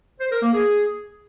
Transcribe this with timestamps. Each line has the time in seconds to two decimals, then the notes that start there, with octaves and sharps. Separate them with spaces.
0.21 C5
0.31 A#4
0.42 A#3
0.53 G#4